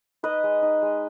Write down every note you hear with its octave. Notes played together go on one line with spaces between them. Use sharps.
D#4 B4 D#5
G#3
D#4
G#3